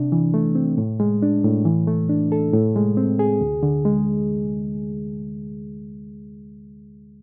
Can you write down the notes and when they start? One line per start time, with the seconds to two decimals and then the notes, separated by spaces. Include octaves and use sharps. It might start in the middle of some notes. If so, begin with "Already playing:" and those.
Already playing: C3 D4
0.12 E3
0.34 A3
0.55 C4
0.78 A2
1.00 G#3
1.22 D4
1.44 A2
1.65 E3
1.87 A3
2.09 D4
2.32 A4
2.53 A2
2.76 G#3
2.97 C4
3.19 G#4
3.41 D2
3.63 D3
3.85 G#3